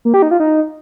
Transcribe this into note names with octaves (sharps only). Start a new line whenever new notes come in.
A#3
G4
D#4
F4
D#4